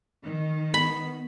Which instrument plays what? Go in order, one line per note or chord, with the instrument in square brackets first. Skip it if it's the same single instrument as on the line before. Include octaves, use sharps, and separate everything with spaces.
[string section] D#3
[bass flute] B3 [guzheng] B5